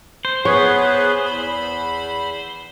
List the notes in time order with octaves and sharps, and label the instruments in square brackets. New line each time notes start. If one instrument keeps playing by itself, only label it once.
[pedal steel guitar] C5
[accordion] B3 G#4 B4 [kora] C#5
[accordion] E2 B5